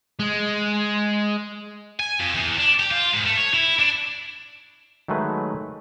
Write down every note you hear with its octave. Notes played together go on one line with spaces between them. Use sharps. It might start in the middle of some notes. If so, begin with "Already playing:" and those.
G#3
G#5
F2
E2
D4
G4
F4
G#2
A3
C#5
E4
D4
D#3 F#3 G#3 A3 B4